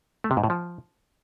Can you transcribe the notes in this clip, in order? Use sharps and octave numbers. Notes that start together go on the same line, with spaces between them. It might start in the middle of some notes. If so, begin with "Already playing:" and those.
A3
C3
G#2
A2
F3